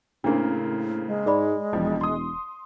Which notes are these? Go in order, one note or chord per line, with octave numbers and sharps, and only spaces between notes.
A2 C#3 A#3 C4 D4 G#4
G#3
G#2 G#4 D5 B5
E1 F2 F3
C6 D#6